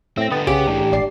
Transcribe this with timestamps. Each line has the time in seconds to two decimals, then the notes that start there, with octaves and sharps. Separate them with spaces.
0.17 A2 C4 E5 G5 A#6
0.31 D3 B3 B4 G5 D#6 A6
0.47 C2 C#3 B3 G4 G#4 D7
0.67 A2 E3 D4
0.92 G#1 D5 C7